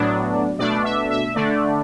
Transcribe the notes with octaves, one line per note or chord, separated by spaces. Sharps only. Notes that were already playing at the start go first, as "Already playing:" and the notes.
Already playing: A2 F#3 B3 D4 D5
B2 A3 D4 D5
E5
E5
D3 A3 D4 D5